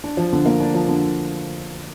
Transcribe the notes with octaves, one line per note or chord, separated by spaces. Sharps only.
D4
F3
D3
A#3
D4
F3
D3